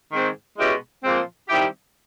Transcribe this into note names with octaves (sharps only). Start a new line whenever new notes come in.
G#2 D#3 G#3 C4
B2 G#3 C#4 E4 G4
A#2 F3 G#3 C4
D#3 G3 C4 E4 G4